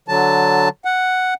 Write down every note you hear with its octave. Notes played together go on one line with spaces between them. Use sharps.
D3 F#3 A5
F#5